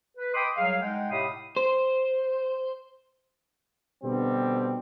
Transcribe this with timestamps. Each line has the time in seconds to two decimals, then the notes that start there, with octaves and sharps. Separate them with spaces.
0.17 B4
0.34 D#5 G5 B5 C6 D6 D#6
0.57 C2 F#3 G#4 F5
0.82 G#3 D#4 F#5 G5
1.11 A2 C3 E5 F5 B5 D#6
1.56 C5
4.04 B2 D3 G3 C4